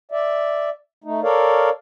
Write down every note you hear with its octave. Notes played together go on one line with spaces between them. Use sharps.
D5 E5
A3 D#4
A4 A#4 C#5 D5 F5